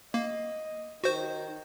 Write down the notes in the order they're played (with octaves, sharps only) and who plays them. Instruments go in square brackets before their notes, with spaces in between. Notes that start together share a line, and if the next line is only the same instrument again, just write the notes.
[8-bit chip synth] A#3 [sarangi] D#5
[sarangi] D#3 [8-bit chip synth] F#4 C5